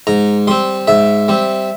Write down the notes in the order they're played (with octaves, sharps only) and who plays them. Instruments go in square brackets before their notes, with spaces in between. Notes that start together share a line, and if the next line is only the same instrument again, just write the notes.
[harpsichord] G#2 A#5
G3 C4 C6
G#2 E5
G3 C4